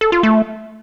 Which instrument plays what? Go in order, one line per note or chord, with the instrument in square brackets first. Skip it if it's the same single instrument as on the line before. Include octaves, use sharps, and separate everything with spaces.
[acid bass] A4
F4
A3